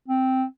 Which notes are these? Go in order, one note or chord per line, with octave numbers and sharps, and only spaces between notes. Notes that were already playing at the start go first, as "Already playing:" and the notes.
C4